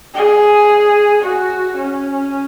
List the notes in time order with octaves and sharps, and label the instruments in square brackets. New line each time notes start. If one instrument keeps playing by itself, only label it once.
[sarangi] G#4
F#4
C#4